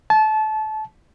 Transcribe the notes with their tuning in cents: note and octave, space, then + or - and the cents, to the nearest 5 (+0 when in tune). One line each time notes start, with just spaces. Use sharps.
A5 -25